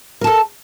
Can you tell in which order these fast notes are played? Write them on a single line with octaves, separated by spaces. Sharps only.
A#4 A5 A4